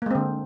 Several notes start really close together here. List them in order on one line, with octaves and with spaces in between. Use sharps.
A#3 G#3 C4 D3